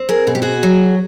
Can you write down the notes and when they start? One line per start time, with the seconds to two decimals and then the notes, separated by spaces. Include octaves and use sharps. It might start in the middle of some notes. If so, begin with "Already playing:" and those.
Already playing: C4
0.09 G#4 A#4
0.27 B2 G#4
0.35 G4
0.42 F#4 G#4
0.63 F#3